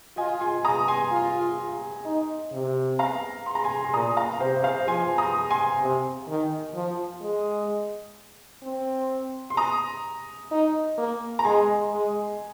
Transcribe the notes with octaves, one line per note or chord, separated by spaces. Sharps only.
F4 D#5 G#5
G#5 C6
A#5 D#6
G#5 C6
F4
D#4
C3
F5 A#5
C6
A#5
G#5 C6
C6
A#2 A#5 D#6
F5 A#5
C3 C5 F5
C5 F5
F3 G#5 C6
A#5 D#6
G#5 C6
C3
D#3
F3
G#3
C4
C6
A#5 D#6
D#4
A#3
A#5
G#3 G#5 C6
G#3